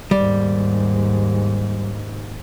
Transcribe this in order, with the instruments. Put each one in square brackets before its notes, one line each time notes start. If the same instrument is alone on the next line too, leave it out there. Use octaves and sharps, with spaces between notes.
[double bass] D#2 G#2 [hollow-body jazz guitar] G3